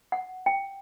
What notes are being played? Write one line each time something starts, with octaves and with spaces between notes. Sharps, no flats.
F#5
G5